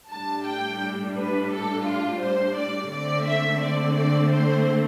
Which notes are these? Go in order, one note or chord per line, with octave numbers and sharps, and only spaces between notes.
A2 G3 D4 A5
G5
B4
A4
F4
C5
D5
D3 A3 C4 D5
E5
D5
D5
C5